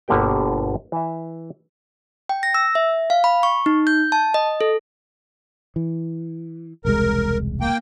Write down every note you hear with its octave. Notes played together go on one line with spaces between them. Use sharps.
G1 B2 D3 A#3 G4 G5
E3 E5
G5
A#6
E6
E5
F5
B5
C#6
D#4
G6
A5
D#5
A4
E3
E1 C2 G#3 A#4
A#3 G5